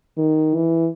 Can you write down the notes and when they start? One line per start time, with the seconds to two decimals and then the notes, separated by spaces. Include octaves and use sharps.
0.17 D#3
0.55 E3